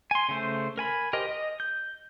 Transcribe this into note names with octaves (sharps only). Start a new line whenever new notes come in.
G#5 C6
C#3 A3 C5
A#4 G#5 B5
G4 A#4 C5 D#5
D#5
G6